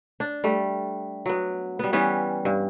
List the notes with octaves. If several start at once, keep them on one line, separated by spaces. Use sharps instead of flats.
D4
G3 A3
F#3 B3
G3 B3
E3 G3 B3 C#4
G2